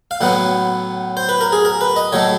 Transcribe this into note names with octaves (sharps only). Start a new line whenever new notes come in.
F5
A2 F#3 B3 F#5
C5
B4
A#4
G#4
A#4
B4
D#5
A2 F#3 A3 C#5